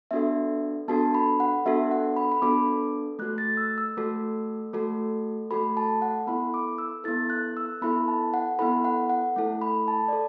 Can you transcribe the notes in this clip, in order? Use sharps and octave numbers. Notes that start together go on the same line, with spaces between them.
B3 D4 F#4 A4 E5
B3 D4 F#4 A4 A5
B5
F#5
B3 D4 F#4 A4 E5
F#5
B5
B5
B3 D4 F#4 A4 D6
A3 F#4 A4 F#6
A6
E6
E6
A3 F#4 A4
A3 F#4 A4
A3 F#4 A4 B5
A5
F#5
B3 E4 A4 B5
D6
E6
B3 E4 A4 A6
F#6
E6
B3 E4 A4 B5
A5
F#5
B3 E4 A4 B5
F#5
F#5
A3 E4 A4
B5
A5
D5
A4